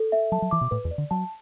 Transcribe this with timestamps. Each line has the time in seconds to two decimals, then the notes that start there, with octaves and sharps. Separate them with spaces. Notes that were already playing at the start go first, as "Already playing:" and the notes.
Already playing: A4
0.12 E5
0.32 F#3 A5
0.42 F#3
0.51 E3 D6
0.61 B2
0.71 A2 B4
0.85 E2
0.91 D5
0.98 D3
1.11 F#3 A5